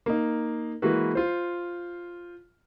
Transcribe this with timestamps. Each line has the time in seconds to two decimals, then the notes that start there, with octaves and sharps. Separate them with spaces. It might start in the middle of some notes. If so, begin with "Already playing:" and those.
0.06 A#3 D#4
0.82 E3 G#3 A#3 F#4 B4
1.15 F4 C5